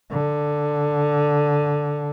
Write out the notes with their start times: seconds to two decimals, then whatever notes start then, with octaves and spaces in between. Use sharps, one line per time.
0.11 D3